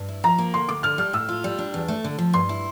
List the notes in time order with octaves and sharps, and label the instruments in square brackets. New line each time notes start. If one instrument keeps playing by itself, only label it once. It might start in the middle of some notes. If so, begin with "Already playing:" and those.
Already playing: [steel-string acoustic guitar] G2
E4
[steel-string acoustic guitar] F3 [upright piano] A#5
[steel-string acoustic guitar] A#3
[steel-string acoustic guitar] D2 [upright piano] C6
[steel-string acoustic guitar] D2 [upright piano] D6
[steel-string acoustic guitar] D3 [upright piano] F6
[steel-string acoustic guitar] G3 [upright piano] F6
[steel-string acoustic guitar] A2 [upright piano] E6
[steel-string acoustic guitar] F4
G3
D4
E2
A3
D3
F3
[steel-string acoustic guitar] G2 [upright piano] C6
[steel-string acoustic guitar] E4